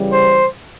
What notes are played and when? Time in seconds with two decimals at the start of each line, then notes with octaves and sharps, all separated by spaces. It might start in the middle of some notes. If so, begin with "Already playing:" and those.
Already playing: C#3 E3 G3
0.12 C5